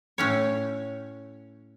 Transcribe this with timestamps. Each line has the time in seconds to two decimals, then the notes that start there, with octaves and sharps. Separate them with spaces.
0.18 A2 C#4 C#5